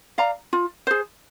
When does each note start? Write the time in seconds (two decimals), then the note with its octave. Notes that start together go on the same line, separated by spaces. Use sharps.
0.18 D5 F5 A#5
0.53 F4
0.87 G#4 C5